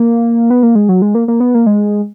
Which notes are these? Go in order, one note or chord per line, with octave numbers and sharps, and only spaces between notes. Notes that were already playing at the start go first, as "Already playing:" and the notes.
Already playing: A#3
B3
A#3
G#3
F#3
G#3
A#3
A#3
B3
A#3
G#3